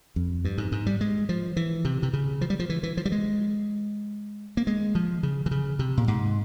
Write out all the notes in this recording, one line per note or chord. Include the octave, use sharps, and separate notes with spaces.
F2
G2
G#2
G#2
G3
G#3
F3
E3
C3
C3
C#3
F3
G3
F3
E3
E3
F3
G3
G#3
A#3
G#3
F3
C#3
E3
C#3
C3
A#2
G#2